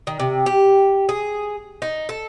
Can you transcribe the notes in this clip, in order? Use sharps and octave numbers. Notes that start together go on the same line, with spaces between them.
D#3
C3
G4
G#4
D#4
A4